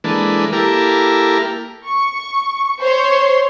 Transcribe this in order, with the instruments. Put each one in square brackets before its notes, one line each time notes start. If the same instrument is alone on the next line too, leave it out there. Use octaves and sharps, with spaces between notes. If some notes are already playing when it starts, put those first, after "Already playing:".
[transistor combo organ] E3 G#3 A#3 D4 A4 B4
A#3 E4 G4 A4 A#4
[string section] C#6
C5 C#5 C6